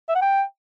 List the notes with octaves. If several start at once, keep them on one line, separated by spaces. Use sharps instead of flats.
E5
F#5
G5